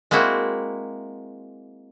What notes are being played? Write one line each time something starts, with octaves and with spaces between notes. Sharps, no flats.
G#3 A#3 C4 E4 F#4